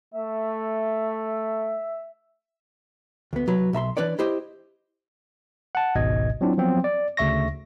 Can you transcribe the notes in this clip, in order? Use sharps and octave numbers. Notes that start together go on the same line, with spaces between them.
A3 E5
D2 B3
C2 F#3 B4
B1 E5 A#5 C6
E3 D4 B4 C#5 D5
E4 G4 C5 D#5
F#5 A5
G#1 C#2 G#2 B2 D#5 G#6
F#3 C4 D4 E4 F4
F3 F#3 B3 C4
D5
D2 C#3 E5 C#6 A#6